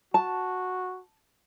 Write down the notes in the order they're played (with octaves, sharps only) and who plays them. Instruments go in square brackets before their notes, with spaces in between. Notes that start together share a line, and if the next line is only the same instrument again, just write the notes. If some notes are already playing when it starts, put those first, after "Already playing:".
[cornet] F#4 [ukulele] A5